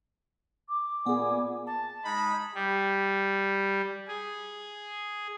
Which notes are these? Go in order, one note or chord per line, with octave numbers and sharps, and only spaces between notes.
D6
A#2 B3 G#4 D5 G#5
A5
G#3 D#4 B5
G3
G#4